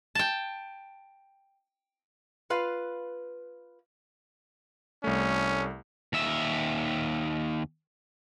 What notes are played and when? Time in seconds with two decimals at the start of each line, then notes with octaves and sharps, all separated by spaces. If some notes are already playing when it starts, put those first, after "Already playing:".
0.15 G5 A5
2.50 F4 B4 F5
5.04 C2 A3 C#4
6.13 D#2 E5